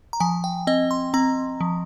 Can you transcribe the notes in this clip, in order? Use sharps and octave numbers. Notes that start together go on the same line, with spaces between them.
A#5
F3 G#5
G5
C4 D#5
C6
C4 A#5
F3